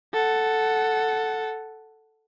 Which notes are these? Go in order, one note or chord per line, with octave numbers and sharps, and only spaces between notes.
A4 F#5